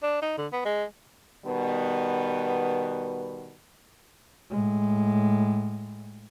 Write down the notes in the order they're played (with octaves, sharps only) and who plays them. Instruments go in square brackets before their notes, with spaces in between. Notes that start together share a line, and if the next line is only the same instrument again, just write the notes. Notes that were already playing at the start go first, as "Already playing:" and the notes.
[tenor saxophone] D4
D#4
D3
B3
G#3
[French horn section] B2 D#3 G3 B3
[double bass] A2 G#3